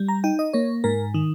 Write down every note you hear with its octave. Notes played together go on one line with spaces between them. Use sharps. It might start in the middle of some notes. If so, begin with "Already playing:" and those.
Already playing: G3
A#5
D#4 G5
D#5
A#3 C#5
G#2 A#4
D#3